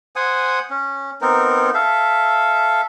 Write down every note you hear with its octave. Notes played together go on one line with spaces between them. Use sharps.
C5 F#5 G#5 D#6
C#4
B3 C4 D#4 A#4
A4 E5 F5